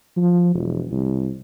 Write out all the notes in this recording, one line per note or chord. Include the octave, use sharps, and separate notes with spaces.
F3
E1
C2